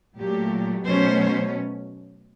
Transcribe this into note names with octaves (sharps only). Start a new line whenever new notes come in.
A#2 F#3 A3 G4
B2 F#3 A3 C#4 C5